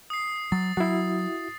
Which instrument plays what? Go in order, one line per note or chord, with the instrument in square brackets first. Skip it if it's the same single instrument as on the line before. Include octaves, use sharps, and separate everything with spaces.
[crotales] D#6 C7
[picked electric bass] F#3 [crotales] A6
[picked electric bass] F#3 [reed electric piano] E4 F#4 [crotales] C7